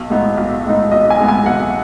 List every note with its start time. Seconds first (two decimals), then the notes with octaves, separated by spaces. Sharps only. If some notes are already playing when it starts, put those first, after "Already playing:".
Already playing: B1
0.10 A2 G#3 B3 D#4
0.38 B1
0.65 A2 G#3 B3 D#4
0.92 B1 D#5
1.10 G#5
1.20 A2 G#3 B3 D#4
1.28 G#5
1.46 B1 F#5